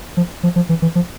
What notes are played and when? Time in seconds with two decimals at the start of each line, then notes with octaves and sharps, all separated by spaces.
0.17 F3
0.43 F3
0.56 F3
0.69 E3
0.82 E3
0.95 F3